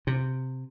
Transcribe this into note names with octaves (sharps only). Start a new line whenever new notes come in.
C3